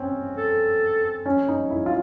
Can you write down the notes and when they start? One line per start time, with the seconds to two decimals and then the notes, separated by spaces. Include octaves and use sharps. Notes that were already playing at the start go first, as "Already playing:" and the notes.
Already playing: C4 C#4
0.37 A4
1.26 C#4
1.48 D#4
1.70 E4
1.86 F4